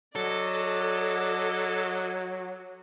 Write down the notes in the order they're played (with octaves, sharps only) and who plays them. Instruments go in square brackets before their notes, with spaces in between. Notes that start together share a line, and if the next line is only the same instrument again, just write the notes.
[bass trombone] F#3 [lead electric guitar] A4 [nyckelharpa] D5 D#5